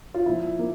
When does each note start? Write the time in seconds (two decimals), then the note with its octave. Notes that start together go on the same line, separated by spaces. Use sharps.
0.14 F4
0.26 A#2 F3 E4
0.59 A#3